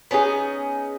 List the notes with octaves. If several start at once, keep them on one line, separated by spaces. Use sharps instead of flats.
B3 C#4 D#4 G#4